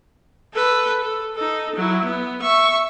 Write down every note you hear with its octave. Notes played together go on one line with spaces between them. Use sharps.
A4 B4
A4
D#4 A4
F#3 E4
B3
E5 C#6